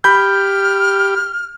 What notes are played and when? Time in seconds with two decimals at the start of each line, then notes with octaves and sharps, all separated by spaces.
0.04 G4 B5 F6 G6